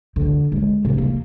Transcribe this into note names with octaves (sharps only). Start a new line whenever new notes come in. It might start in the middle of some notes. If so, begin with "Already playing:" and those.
D3
G#3
C3
A#3